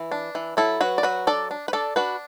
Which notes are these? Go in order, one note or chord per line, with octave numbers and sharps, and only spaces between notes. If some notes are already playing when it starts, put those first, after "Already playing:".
Already playing: E3
D4
E3
F#3 E4 A4
F#3 F#4 B4
D5
F#3 F#4 B4
D4 A4 D5
D4
B4
D4 A4 D5
D4 F#4 B4